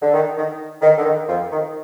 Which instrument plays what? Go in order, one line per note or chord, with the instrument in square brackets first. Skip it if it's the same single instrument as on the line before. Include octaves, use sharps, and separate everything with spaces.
[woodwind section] D3
D#3
D#3
D#3
D3
D#3
F2 F3
D#3